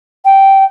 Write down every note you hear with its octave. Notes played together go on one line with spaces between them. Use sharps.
G5